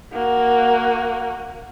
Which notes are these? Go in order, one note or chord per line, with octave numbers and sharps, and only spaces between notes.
A#3 F#4